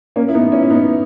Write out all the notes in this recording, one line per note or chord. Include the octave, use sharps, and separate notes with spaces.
A#3 C#4
E4
B3 D#4
C#4 E4
E4
B3 D#4